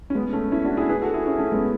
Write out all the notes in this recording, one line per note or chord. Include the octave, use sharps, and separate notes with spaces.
C#4
G#3 B3
A3 C#4
C#4 E4
D4 F#4
E4 G#4
G#4 B4
F#4 A4
E4 G#4
C#4 E4
A3 C#4
G#3 B3